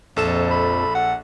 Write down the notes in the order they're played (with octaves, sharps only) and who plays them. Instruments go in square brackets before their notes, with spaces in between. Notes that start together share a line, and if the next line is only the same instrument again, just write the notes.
[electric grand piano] A#1 A4 E7 [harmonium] F2
[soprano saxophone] B5
F#5